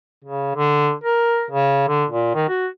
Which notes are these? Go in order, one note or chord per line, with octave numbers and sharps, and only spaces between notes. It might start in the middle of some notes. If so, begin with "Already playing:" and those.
C#3
D3
A#4
C#3
D3
A#2
D#3
F#4